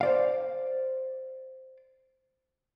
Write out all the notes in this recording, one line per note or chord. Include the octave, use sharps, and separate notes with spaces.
C5 D5 F5